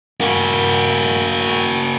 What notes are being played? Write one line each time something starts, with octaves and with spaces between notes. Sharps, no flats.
A#3 F#4